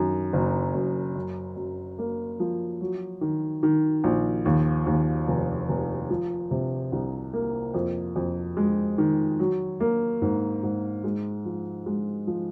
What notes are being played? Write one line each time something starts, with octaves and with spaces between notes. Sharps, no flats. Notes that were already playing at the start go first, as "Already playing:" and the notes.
Already playing: F#2 D#3
F#1
F#2
F#2
F#2
A#3
F3
F#3
D#3
D#3
A#1
D#2
D#2
F1
F1
F3
C3
C2
A#3
F2
F2
G#3
D#3
F#3
A#3
G#2
G#2
G#3
F3
G#3
F3